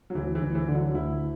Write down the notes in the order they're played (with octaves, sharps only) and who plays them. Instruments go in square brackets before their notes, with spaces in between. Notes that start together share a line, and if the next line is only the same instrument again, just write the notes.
[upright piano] F#3
[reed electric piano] D2 [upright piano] E3
[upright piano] E3
[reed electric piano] D2
[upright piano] E3
[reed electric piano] D3
[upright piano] F#3
[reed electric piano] D2 [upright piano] E4